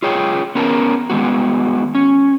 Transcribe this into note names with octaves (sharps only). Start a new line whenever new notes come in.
F4 G#4 C#5 G5
B3 C#4 A#4 G#5 A5
D#3 G#3 B3 F#4
C#4